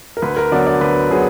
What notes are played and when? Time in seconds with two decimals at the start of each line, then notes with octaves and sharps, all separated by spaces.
0.17 A#4
0.22 D2 B4
0.37 A#4
0.52 D3 F#3 B3 D5
0.67 D5
0.81 D2 B4
1.10 D3 F#3 B3 G#4